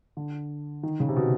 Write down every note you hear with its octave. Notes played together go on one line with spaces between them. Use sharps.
D3
D#3
C#3
C3
B2